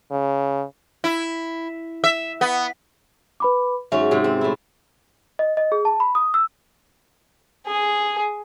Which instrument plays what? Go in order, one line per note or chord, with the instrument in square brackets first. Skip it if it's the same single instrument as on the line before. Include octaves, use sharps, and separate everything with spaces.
[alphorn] C#3
[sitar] E4
E5
B3
[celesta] B4 B5 D6
[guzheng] G#2 F#3 C#4 [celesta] E5
[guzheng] G#2 C3
C4
A2 E4
[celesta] D#5
D#5
G#4
A5
B5
D#6
E6
[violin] G#4